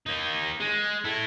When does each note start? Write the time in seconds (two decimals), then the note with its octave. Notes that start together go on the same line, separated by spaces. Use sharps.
0.06 A#3 D#4
0.60 G#3
1.04 E4 A4